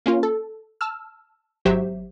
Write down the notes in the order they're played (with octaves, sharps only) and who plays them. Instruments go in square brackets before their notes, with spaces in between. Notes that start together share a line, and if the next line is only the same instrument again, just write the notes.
[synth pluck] A#3 C#4 F4
A4
A5 E6 F6
G#1 F#3 G4 C5 E5